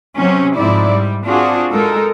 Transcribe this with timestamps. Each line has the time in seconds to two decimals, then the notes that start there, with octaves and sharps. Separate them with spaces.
0.17 C3 F#3 C4 C#4
0.57 G#2 F3 C4 E4 D5
0.91 G3
1.24 C4 D4 F4 F#4 G#4
1.71 G#2 G#3 D#4 A4 A#4